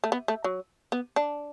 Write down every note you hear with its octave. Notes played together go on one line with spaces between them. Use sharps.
A3
B3
A3
F#3
B3
D4